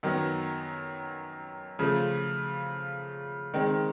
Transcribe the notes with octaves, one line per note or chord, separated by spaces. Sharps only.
F#2 D#3 F#3 B3
C#3 F3 A3
D#3 G#3 C4